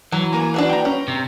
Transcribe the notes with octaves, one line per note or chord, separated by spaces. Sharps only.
E3 F#3
A#3 G#5 A#5
D4 F#4 B4
G5 A#5
C#4
C3